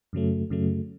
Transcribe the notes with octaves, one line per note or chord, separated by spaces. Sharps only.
F#2 C#3 F#3 A3
F#2 C#3 F#3 A3